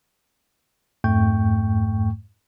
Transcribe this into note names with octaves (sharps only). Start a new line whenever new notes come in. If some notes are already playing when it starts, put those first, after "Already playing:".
F2 G#2 A3 G5 C#6 G6